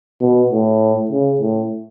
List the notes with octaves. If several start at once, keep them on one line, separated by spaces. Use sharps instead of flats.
B2
A2
C#3
A2